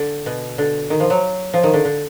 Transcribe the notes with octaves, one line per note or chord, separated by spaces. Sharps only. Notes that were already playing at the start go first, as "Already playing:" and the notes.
Already playing: D3
B2
D3
D#3
F3
F#3
F3
D#3
D3
D3